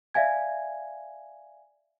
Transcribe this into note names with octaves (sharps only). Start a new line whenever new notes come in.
D5 E5 F5 G#5 G#6